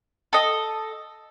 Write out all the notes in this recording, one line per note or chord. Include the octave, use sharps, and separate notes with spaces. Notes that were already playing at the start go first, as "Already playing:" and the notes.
A4 D#5